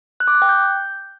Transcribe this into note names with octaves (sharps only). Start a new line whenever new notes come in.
F#6
D6
F#6
G5
G6